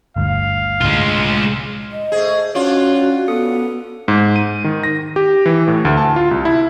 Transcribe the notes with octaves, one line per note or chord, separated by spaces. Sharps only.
G1 D2 G2 F5
C2 A2 D3 G#3 F4
D#5
A3 G#4 C5
C#4 D4 F4 F#4 C#5
B3 A4 D#6 C#7
G#2
D#7
D#3
A#6
G4
E3
A2
D2
A5
F4
C2
E4